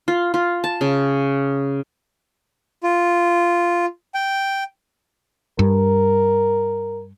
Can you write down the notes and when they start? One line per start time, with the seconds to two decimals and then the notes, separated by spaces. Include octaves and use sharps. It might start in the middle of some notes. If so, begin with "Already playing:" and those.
0.08 F4
0.34 F4
0.64 A5
0.81 C#3
2.83 F4
4.14 G5
5.59 G2 A#4